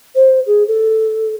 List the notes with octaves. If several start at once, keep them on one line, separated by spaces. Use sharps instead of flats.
C5
G#4
A4